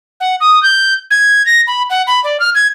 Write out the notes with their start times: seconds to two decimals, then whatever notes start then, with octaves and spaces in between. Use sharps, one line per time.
0.20 F#5
0.41 D#6
0.63 G6
1.11 G#6
1.46 A#6
1.67 B5
1.90 F#5
2.07 B5
2.24 D5
2.40 F6
2.55 G#6